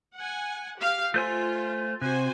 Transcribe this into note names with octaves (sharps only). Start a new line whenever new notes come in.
F#5 G#5
G4 F5
A3 F4 C5 G#5
C3 F#4 C5 G#5